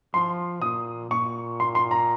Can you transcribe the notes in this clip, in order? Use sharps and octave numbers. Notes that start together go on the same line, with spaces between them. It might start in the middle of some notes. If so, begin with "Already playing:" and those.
F3 C6
A#2 D#6
A#2 C#6
C6
C6
A#5